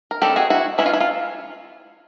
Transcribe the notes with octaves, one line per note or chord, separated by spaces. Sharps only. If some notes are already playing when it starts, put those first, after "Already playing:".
A#4
D#3 G3 C4 D#4 G4 A4
F#4 G#4
E4 F#4
E3 G#3 C#4 E4
F4
E4
F4